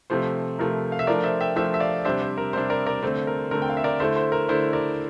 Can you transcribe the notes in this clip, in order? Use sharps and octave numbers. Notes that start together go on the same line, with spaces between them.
C3 F3 A3 C5
C3 F3 A3 A#4
F5
E5
F3 A3 D4 A#4 D5
C5 E5
E5 G5
F3 A3 D4 C5 E5
E5
D5 F5
C3 G3 D4 C5 E5
C5
A#4
C3 G3 D4 C5
A#4 D5
A#4 D5
D3 A3 C4 C5
A#4
D3 A3 C4 A#4
G5
F5
E5
A#4 D5
D3 A3 E4 C5 E5
C5
A#4
D3 A3 E4 C5
A#4 D5